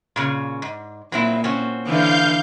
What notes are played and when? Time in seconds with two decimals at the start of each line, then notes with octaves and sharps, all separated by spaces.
0.16 A#2 C#3 C#4
0.62 G#2
1.12 A#2 F#3 C4 E4
1.44 C4 C#4 F#4
1.86 D3 E3 F5 G6